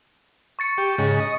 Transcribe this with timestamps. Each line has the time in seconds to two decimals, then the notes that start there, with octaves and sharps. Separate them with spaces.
0.59 C#6 A6 C#7
0.78 G4
0.98 G#2 C#3
1.20 D#5